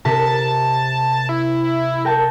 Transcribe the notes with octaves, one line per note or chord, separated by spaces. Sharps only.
C3 A#4 A5 B6
E4
A#4 G5 A5